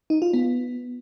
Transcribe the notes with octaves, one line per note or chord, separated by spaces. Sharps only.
D#4
F4
B3